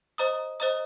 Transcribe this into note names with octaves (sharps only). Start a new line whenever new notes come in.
C5 D#5 A#5 D#6
C5 D#5 A#5 D#6